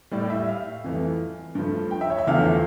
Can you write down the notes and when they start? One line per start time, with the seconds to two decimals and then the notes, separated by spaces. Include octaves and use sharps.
0.11 A2 G3 D5
0.30 E5
0.48 F5
0.84 F2 E3 A3
1.55 G2 F3 A3
1.91 G5
2.01 E5
2.10 C#5
2.18 E5
2.27 E2 D3 F3 A3 F5